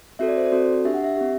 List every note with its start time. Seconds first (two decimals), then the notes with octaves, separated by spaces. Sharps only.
0.19 C4 F#4 A4 E5
0.28 D5
0.37 C5
0.46 D5
0.52 C4 F#4 A4
0.85 D4 G4 E5
0.94 F#5
1.04 E5
1.17 C4 G4